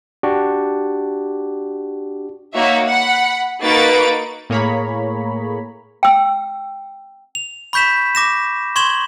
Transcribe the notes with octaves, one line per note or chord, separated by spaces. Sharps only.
D4 F#4 G4
A#3 D#4 F#4 C#5 E5
F#5 B5
A#3 D#4 F#4 B4 A6 D7
A2 A#3 G#4 C#5 A#5 B5
G5 E6
F7
B5 C#6 G6 B6 E7
D6 A#6 E7
C6 C#6 G#6 E7 F#7 G7